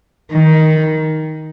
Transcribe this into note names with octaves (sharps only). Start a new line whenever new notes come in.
D#3